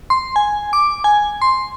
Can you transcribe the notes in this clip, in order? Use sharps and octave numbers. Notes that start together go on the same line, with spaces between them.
C6
G#5
D6
G#5
C6